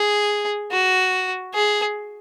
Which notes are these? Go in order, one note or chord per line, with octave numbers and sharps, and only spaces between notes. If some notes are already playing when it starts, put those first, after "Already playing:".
Already playing: G#4
F#4
G#4